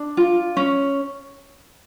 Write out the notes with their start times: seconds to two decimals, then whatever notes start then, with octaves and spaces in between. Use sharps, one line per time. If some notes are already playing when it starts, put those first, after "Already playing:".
Already playing: D4
0.17 F4
0.57 C#4